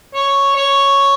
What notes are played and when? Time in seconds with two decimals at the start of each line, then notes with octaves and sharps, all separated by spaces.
0.14 C#5
0.56 C#5